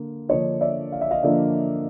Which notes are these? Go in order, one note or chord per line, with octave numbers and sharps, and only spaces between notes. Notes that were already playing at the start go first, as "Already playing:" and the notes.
Already playing: D3 A#3
D3 F3 A#3 D4 C#5 D#5
D5 E5
F5
E5
D#5 F5
D3 F3 A#3 D4 D5 E5